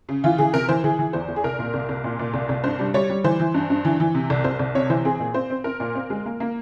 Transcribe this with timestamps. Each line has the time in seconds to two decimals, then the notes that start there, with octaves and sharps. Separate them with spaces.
0.09 C#3
0.24 E3 F4
0.38 E3 G#4
0.53 C3 A#4
0.69 E3 C5
0.84 E3 G#4
0.99 E3
1.13 E2 C5
1.28 E2
1.36 G#4
1.44 C2 A#4
1.59 A#2
1.74 C2
1.89 C2
2.04 A#2
2.19 A#2
2.34 C2
2.49 C2
2.64 G2 C5
2.79 G3
2.94 G3 C#5
3.10 G3
3.24 E3 C5
3.40 E3
3.54 G2
3.70 G2
3.85 E3
4.00 E3
4.14 C3
4.30 C2
4.44 C2 C5
4.59 C2
4.75 C3 C#5
4.90 E3 C5
5.05 C4 G#4
5.20 A#2
5.34 C4 C5
5.50 C4
5.64 C4 A#4
5.80 A#2
5.95 C4
6.10 G#3
6.25 A#3
6.40 A#3